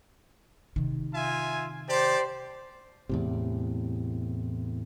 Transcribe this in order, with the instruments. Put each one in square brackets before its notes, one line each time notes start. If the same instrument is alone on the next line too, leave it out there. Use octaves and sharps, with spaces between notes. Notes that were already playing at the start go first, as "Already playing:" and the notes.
[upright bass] C3 D#3
[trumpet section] F4 E5 G#5
[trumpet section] G4 D5 A5 [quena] C5
[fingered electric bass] E2 A2 C3